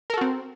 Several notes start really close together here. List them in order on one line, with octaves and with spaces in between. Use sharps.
A#4 A4 F#4 C4